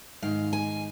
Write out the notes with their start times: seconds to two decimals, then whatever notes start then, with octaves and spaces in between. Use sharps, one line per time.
0.22 G#2 D#3 G#3 F5
0.53 G#5